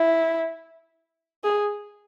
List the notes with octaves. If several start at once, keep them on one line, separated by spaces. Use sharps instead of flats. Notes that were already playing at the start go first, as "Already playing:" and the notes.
Already playing: E4
G#4